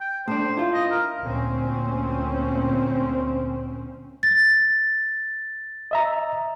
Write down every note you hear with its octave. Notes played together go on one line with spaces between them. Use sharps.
G5
A2 D4 C5
E4 F4
D#5
A#4
D2 A#2 C4 C#4
A6
D#5 E5 A#5